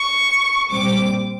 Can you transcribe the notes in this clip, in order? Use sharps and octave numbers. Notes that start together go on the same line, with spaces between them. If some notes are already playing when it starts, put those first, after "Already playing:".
Already playing: C#6
A#2 G3 C4 D6